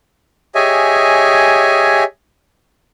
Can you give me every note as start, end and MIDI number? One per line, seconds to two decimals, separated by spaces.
0.55 2.04 67
0.55 2.04 68
0.55 2.04 73
0.55 2.04 75
0.55 2.04 76
0.55 2.04 80